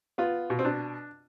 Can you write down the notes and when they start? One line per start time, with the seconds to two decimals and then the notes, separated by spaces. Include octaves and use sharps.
0.18 B3 F4
0.50 B2
0.59 C4
0.65 D4